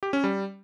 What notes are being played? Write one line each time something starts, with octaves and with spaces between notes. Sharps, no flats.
G4
C#4
G3